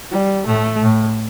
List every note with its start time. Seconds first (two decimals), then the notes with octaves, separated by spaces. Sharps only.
0.11 G3
0.47 A2 A3
0.82 A2